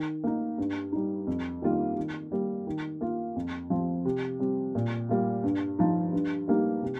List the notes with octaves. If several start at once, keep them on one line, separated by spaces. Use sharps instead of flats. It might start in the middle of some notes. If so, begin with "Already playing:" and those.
Already playing: D#3
A#3 D#4
G2
G3 D#4
F2
D#3 G3 A#3 F4
D#3
G3 A#3
D#3
A#3 F4
F2
F3 C4
C3
G3 C4
A#2
G3 A#3 F4
G2
F3 D#4
G2
G3 A#3 D#4
C3